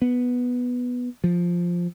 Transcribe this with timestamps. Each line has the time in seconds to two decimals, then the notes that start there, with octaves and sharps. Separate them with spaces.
0.02 B3
1.24 F3